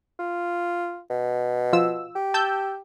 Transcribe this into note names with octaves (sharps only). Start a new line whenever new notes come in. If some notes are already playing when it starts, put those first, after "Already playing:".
F4
B2
F3 F4 E6
G4
A5 E6 G6